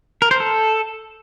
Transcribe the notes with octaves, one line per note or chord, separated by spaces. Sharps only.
A#4
C5
A4